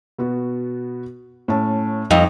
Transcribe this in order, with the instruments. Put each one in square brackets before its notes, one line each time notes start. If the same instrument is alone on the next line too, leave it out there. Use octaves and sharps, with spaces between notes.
[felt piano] B2 B3 F#4
A2 C#4 A5
[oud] F2 D#4